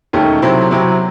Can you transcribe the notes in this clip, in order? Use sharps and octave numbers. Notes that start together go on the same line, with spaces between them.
E1 D#2 D#3 A3 C#4
C3 F#3 C4 E4
C3 F#3 C4 E4